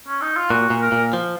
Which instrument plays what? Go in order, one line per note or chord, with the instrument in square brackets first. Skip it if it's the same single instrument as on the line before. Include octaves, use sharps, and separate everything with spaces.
[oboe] C#4
D#4
F4
[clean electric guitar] A#2 [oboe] F#4
[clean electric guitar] A#2
[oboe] A#4
[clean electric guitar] A#2
F3